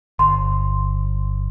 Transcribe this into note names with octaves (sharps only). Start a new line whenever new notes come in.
G1 C6